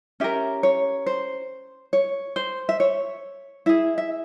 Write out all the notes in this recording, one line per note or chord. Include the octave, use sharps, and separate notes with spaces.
C#4 G4 A#4 E5
C#5
C5
C#5
C5
E5
C#5
E4 G#4 E5
E5